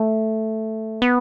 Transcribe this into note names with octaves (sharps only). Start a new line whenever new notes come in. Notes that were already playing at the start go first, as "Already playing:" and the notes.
Already playing: A3
B3